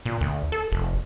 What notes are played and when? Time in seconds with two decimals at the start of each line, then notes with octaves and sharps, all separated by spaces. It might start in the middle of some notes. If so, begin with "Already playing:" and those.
0.06 A#2
0.21 D2
0.52 A4
0.72 F1